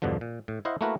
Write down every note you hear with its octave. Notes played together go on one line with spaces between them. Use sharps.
E2 G2 B2 D3 F3
A#2
A2
E4 C5 D#5 F5 F#5
A3 A#3 E4 F#4 A#4 B4